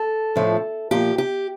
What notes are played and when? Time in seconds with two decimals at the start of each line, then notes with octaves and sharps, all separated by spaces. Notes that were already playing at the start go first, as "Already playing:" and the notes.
Already playing: A4
0.36 A2 F3 A3 D4
0.91 A#2 F3 A#3 G4
1.18 G4